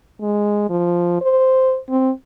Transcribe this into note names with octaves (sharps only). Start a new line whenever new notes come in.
G#3
F3
C5
C4